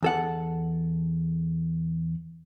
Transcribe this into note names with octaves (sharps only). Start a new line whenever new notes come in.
E2 A4 F#5